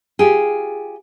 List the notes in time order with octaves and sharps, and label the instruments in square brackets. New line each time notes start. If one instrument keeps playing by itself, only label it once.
[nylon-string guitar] F4 G4 G#4